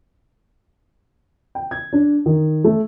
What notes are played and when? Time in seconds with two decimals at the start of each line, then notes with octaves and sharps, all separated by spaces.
1.55 G5
1.71 G#6
1.93 D4
2.26 D#3
2.64 A3